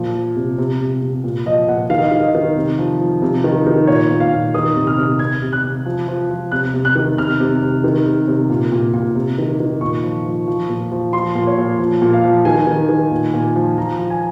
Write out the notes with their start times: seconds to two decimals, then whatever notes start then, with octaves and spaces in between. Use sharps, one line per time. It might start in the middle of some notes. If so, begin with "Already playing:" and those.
Already playing: A#2 F3
0.14 F3
0.36 C3
0.58 C3
0.80 C3
1.02 C3
1.24 A#2
1.46 F3 D#5
1.67 A#2 F#5
1.90 D#3 F5
1.98 D#5
2.07 D#3 F5
2.22 D#5
2.35 D#3
2.56 C3
2.78 F3
3.00 F3
3.22 C3
3.44 D#3
3.67 D#3
3.87 A#2 C#5
4.10 A#2
4.20 F5
4.32 A#2
4.54 D#3 D#6
4.76 C3
4.87 F6
4.98 C3
5.19 C3 G#6
5.42 C3
5.53 F#6
5.64 C3
5.86 F3
6.08 F3
6.30 F3
6.52 C3 F#6
6.74 C3
6.85 F#6
6.95 D#3
7.17 C3 F6
7.40 C3
7.62 C3
7.84 D#3
8.06 C3
8.28 C3
8.50 A#2
8.72 A#2
8.94 A#2
9.15 C3
9.38 D#3
9.60 D#3
9.81 A#2 C#6
10.03 F3
10.26 F3
10.48 F3
10.69 A#2
10.91 F3
11.13 F3 C6
11.35 A#2
11.47 C#5
11.58 A#2
11.79 F3
12.02 A#2
12.13 F5
12.24 F3
12.45 D#3 G#5
12.67 D#3
12.89 D#3
13.11 A#2
13.34 A#2
13.56 F3
13.78 F3 A#5
13.99 F3
14.10 G#5